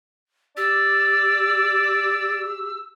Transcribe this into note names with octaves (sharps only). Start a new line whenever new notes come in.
G4 D5 E6